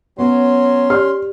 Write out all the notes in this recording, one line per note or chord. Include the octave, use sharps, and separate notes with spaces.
F#3 B3 C#4 C6
G4 D5 F6